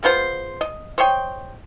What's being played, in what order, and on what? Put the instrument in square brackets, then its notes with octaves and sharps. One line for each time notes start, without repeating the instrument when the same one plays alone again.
[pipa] G#3 B3 F4 C5
D#5
C5 C#5 D#5 G5